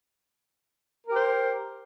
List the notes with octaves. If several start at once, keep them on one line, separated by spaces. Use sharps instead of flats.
G4 A#4 C5